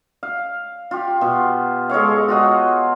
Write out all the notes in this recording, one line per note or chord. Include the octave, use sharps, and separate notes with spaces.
F5
F4 G4
B2
G#3 A4 C#5 F5
F4 F#4 D#5